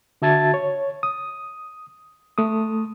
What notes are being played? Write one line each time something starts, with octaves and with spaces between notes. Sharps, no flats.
D3 F#4 E5 A5 G#6 A6
C#5
D#6
A3 D#6